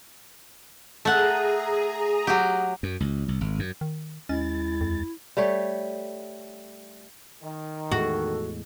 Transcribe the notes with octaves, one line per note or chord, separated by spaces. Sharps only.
A3 G#4 F#5 A#5 D#6
F#3 G4
F#2
C#2
C2
G#1
F#2
D#3
D#2 G#3 C#4 E4 A6
F2
G3 A3 C#5
D#3
E2 A2 G#3 F#4 A4